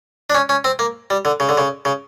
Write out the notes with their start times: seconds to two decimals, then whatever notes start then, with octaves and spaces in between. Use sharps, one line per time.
0.30 D4
0.35 C#4
0.49 C#4
0.64 C4
0.79 A#3
1.10 G3
1.25 D3
1.40 C#3
1.49 D3
1.58 C#3
1.85 C#3